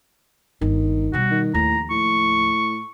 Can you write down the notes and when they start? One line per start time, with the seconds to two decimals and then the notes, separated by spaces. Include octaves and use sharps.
0.61 G1 D#3
1.13 B2 G3 F#4
1.31 D#3
1.54 D#2 A2 F3 A#5
1.90 A2 C#6